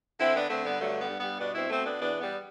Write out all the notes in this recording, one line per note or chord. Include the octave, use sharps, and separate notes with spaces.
D3 C4 E4
B3 D4
D3 A3 C4
G3 B3
G2 F#3 A3
G3 B3
G2
G3 B3
B2 B3 D4
C4 E4
B2 A3 C4
B3 D4
E2 B3 D4
G3 B3